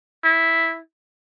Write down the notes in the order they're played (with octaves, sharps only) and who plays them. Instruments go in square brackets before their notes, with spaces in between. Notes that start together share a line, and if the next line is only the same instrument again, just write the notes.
[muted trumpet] E4